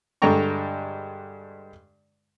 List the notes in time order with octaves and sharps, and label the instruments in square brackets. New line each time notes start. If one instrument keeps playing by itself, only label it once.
[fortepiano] G2 D3 G#3 G5 A#5 C#6